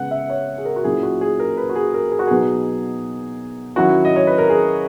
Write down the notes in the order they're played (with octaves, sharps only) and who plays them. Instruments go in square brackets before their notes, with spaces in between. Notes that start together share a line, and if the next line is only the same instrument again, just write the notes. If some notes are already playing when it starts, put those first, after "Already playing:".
Already playing: [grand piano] C#3 G#3 B3 F#5
E5
C#5
G#4
A#4
F#4
A#2 F#3 C#4 E4 G#4
F#4
G#4
A#4
B4
F#4
G#4
A#4
G#4
F#4
B2 F#3 B3 D#4 G#4
D#3 F#3 C#4 E4 F#4
D#5
C#5
B4
A#4
G#4